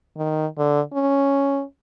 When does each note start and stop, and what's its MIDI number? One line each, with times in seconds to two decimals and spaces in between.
0.17 0.46 51
0.58 0.81 50
0.93 1.63 61